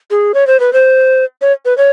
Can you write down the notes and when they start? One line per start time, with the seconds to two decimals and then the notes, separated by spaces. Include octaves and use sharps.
0.11 G#4
0.34 C#5
0.47 C5
0.60 B4
0.73 C5
1.41 C#5
1.65 B4
1.78 C#5